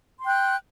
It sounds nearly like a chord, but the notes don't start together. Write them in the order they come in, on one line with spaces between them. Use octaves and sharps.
C6 G5 F#6